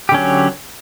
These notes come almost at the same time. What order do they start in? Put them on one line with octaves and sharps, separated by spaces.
G4 D3 C#4 F#3